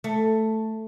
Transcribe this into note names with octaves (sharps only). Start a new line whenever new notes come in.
A3